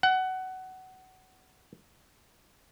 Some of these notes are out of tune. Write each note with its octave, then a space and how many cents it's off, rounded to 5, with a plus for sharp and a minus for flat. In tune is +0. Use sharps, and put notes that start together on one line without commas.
F#5 +20